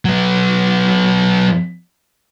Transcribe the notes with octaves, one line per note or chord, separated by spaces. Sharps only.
F#3 B3